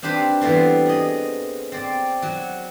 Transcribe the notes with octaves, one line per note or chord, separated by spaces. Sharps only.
C4 D4 G4 B4 C5
E3 G3 A3 B3 C4
G#4 D#5
C4 D5
F#3